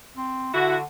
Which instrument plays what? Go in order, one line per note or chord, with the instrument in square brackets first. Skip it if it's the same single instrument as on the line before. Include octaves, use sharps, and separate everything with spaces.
[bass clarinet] C4
[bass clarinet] D3 [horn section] E4 F#4